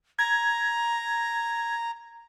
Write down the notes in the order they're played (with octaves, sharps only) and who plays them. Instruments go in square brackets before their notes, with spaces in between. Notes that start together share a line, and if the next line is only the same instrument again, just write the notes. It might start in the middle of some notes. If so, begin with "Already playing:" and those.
[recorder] A#5 [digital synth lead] G#6